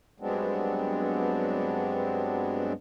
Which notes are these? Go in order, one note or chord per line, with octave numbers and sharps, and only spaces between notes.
G2 F#3 G#3 B3 C4 D4